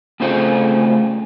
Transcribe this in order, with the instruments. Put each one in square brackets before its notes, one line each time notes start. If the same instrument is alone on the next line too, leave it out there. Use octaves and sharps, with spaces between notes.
[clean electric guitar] A2 C#3 A3 C4 F4